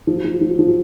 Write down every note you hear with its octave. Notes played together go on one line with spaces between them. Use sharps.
F3
F#3
F3
F#3
F3
F#3
F3
F#3